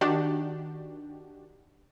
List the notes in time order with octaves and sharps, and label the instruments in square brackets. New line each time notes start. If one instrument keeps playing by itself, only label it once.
[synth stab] D#3 D4 F#4 G4